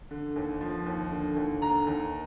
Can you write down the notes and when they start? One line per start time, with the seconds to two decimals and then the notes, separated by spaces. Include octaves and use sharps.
0.11 D3
0.36 D#2
0.61 F3
0.86 D#2
1.11 D3
1.36 D#2
1.62 D3 A#5
1.87 D#2